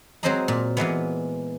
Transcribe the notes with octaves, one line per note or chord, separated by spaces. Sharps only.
F#3 G#3 C4 C5 D#5 A#5
A#2
A#2 E3 G#3 B3